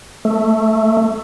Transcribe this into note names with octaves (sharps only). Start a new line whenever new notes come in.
A3